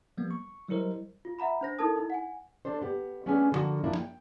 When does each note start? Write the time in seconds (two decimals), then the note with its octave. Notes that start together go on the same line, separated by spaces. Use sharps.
0.17 F3 G3 A#3 B3
0.31 C#6
0.68 F#3 G3 E4 A#4 C5 D#5
1.25 F4
1.39 E5 F#5 A#5 B5
1.61 D4 C5 A#6
1.79 D#4 E4 A4 A#4 A5 D#6
1.96 D#4 E4
2.10 F#5 G#5
2.65 D4 A4 C5
2.82 B3 G4
3.26 A3 B3 C#4 D4 G#4 G#5
3.52 D3 F3 G3 A#3 F#4
3.84 F3 A#3 D4 E4 F4
3.97 G5